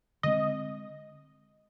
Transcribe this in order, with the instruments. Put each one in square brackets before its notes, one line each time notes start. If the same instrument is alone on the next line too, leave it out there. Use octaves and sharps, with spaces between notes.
[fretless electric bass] D3 G#3 C4 [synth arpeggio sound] D#5